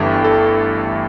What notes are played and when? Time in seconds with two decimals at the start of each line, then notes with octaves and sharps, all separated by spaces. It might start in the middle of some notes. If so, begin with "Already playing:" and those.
Already playing: G1 G2 E3 A3 E5 G5
0.24 A4